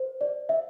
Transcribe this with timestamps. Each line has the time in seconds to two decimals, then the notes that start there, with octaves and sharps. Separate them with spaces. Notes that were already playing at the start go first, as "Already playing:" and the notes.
Already playing: C5
0.21 D5
0.49 E5